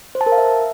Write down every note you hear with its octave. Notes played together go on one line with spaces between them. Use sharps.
C5
A5
A#4
F5
E5